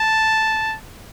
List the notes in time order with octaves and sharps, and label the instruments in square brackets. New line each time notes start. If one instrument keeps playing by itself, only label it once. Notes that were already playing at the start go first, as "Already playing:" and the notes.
Already playing: [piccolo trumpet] A5